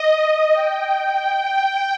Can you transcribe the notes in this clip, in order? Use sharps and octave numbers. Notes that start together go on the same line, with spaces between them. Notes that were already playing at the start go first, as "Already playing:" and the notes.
Already playing: D#5
G5